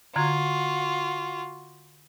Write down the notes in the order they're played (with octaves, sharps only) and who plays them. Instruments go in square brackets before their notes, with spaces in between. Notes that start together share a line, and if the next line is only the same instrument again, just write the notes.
[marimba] D3 A#5 G#6 [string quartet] F4 F#4